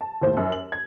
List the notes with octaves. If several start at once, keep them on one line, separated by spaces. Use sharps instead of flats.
A5
D#2 A2 C5
F#2
F#7
G#6